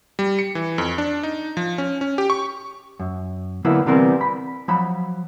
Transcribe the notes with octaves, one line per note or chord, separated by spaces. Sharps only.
G3
C#7
E3
F2
D4
D#4
F3
C#4
C#4
G4
C#6
F#2
D3 F#3 A#3 B3 E4
C3 E3 G3 B3 C4 A#4
B5
F3 F#3 B5